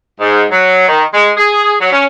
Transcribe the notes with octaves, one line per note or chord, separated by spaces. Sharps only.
G#2
F#3
D#3
G#3
G#4
F#3
C#4